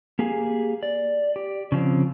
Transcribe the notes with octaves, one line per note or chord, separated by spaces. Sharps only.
A#3 G4 G#4 G#5
D5
G4
C#3 F3 C4